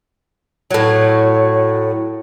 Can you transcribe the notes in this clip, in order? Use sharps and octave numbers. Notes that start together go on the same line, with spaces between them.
A2 F#3